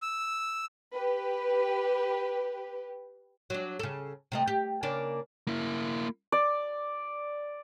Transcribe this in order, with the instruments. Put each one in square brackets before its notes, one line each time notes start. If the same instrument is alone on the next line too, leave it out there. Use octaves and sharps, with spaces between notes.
[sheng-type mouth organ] E6
[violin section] G4 B4
[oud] F#3 D4
C#3 A4
C3 A3 D#5
G4
C#3 A#3 D4
[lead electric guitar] A#3 E4
[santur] D5